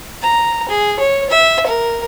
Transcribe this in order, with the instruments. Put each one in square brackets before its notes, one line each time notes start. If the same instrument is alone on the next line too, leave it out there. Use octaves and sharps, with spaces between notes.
[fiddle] A#5
G#4
C#5
E5
A#4